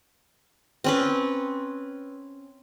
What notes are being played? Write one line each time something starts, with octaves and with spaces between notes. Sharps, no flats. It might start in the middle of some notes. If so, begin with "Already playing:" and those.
C4 C#4 B4